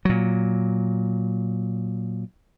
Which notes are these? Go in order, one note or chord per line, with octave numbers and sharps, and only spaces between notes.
A#2 F#3